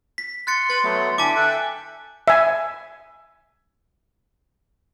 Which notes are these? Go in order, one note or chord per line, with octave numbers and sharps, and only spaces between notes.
B6
C6 F#6 A6 C#7
B4 B5 A6
F#3 A3 B3
D3 E4 G#5 A5 D6 B6
A4 E5 G5 F#6
E5 G#5